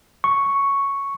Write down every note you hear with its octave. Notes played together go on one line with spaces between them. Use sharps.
C#6